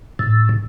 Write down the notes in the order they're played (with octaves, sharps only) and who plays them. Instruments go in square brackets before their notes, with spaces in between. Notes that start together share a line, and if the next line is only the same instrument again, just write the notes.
[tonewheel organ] A2